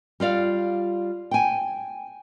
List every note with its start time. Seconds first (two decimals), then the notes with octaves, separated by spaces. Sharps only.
0.20 G3 F4 D5 F5
1.31 G5 G#5